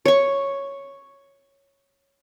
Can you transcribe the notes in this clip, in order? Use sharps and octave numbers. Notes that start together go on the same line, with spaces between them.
C#5 C#6